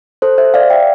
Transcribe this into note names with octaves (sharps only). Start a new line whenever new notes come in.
A4 C5
C5 E5
D5 F5
E5 G5